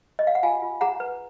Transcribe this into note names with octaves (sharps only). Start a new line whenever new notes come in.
D#5
F5
F#5
F4 F5 G#5
F4
G#4 F#5 A#5
B4